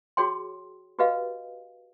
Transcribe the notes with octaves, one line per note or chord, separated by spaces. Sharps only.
F#4 G#4 C#5 G5 C6
F#4 G4 B4 D#5 F5